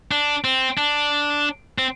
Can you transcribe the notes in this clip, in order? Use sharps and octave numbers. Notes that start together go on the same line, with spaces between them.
D4
C4
D4
C4